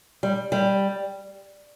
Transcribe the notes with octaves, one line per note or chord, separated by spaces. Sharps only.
G3
G3